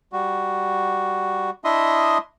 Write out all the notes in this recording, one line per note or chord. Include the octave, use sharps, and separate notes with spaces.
G3 F#4
D4 E4 D#5 E5 C6 D#6